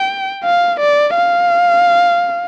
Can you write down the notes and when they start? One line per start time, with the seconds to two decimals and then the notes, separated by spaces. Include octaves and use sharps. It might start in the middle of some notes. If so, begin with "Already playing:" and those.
Already playing: G5
0.44 F5
0.80 D5
1.16 F5